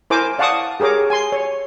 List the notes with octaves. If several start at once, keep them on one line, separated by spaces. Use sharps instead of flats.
E4 A#4 C5 G#5 D6
D5 F5 F#5 A5 C#6 D#6
G4 G#4 A#4 C#5 D6
G#5 C6
C#5